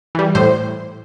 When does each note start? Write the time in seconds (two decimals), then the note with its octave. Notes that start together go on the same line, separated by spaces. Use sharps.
0.15 E3 G3
0.35 A2 C5